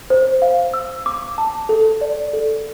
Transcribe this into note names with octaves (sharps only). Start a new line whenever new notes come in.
C5
F5
E6
D6
A5
A4
D5
A4